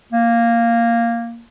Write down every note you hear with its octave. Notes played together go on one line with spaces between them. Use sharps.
A#3